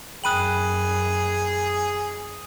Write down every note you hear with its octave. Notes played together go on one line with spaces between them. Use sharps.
F#2 G#4 G5 B5 D#6 F#6 D#7 F#7